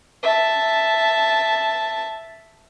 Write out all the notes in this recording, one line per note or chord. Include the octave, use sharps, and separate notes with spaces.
E5 A5